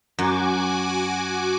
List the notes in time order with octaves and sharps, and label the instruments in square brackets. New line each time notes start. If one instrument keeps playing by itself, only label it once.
[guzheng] F#2 [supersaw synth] F#4 G#5 D6